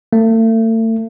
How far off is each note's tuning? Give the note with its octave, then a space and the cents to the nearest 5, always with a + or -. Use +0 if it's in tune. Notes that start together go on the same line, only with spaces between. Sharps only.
A3 +35